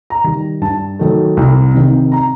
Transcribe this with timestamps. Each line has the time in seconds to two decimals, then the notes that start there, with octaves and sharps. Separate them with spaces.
0.10 A#5
0.24 D#3 G3
0.61 G2 A5
0.99 D#3 F#3 A3
1.37 C2
1.74 C3 D#3
2.12 A#5